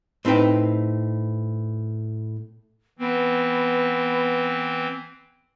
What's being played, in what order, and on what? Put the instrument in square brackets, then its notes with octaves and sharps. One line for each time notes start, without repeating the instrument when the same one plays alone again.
[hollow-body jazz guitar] A2 C4 D#4 B4 G5
[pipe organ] E3 C4 [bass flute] B3